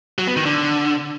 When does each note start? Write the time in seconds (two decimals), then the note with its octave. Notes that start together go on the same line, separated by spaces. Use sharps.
0.18 F#3
0.27 B3
0.37 D#3
0.46 D3